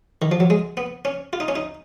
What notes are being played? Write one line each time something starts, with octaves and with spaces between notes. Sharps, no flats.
D#3
F3
F#3
G#3
B3
C#4
F4
D#4
C#4
D#4